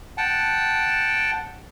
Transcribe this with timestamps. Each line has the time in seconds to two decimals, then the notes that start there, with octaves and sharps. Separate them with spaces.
0.18 F#5 G5 A5